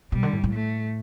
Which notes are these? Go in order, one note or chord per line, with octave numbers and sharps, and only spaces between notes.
B2 G3
D3
A2
A2
A3